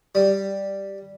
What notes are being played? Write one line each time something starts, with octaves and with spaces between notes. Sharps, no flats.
G3